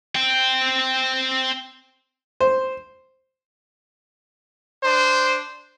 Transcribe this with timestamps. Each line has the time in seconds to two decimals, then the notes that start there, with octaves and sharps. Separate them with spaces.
0.15 C4 G5
2.41 C5
4.83 D4 C5